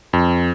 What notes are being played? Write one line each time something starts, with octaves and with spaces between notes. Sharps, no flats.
F2